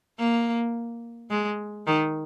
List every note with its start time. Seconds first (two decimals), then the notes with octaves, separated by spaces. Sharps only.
0.19 A#3
1.30 G#3
1.87 D#3